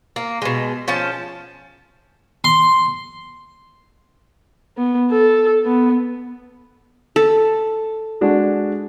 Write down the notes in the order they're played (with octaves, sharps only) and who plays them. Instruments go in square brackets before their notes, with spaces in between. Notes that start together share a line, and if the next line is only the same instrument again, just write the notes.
[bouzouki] A#3
B2 G#3
F3 C#4 A5
[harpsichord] C6
[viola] B3
A4
B3
[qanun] A4
[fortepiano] G#3 D4 F#4